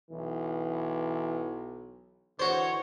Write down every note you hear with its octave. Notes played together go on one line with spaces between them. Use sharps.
B1 E3
D3 E3 F#4 C5 C#5